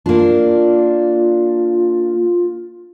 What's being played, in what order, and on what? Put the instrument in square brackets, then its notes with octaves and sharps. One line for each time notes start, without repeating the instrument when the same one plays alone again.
[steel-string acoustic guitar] A#3 D4 [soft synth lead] F4